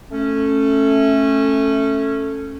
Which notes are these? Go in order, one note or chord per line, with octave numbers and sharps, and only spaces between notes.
A3 C#4